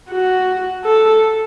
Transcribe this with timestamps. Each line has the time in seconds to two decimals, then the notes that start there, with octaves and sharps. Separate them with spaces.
0.10 F#4
0.85 A4